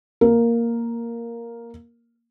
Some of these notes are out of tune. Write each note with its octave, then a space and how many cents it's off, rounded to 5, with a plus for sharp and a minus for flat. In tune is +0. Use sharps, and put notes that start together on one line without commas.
A#3 +0 A#4 +0